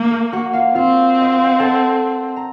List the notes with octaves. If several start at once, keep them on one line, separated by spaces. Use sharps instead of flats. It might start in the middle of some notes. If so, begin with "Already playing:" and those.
Already playing: A#3
A#4
F#4 F#5
F4 F5
C4 F4 F5
D#5
F5
F#5
A4 A5
A#5